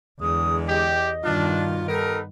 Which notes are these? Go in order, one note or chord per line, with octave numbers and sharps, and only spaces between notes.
E2 D3 G#3 D#6
G4 D#5
G2 B2 D#3 D4 F4
B3 D#4 G4 A4 A#4